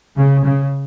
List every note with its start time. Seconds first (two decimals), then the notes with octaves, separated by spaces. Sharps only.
0.17 C#3
0.44 C#3